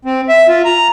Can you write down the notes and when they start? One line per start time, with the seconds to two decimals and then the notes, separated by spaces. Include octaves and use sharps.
0.05 C4
0.29 E5
0.48 F4
0.65 A#5